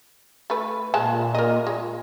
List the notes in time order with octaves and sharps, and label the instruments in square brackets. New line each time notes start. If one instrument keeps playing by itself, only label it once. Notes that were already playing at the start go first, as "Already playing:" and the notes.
[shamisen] A3 B4
[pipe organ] A#2 [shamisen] G#3 A5
[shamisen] A#4 D#5
G#3